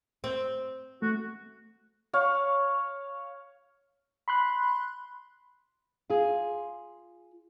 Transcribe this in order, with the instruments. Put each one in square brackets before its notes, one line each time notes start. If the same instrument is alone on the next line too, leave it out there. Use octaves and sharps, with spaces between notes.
[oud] C4
[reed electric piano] A3 [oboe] F#4
[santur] C#5 F5
[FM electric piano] B5 C6 F#6
[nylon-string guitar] F4 G#4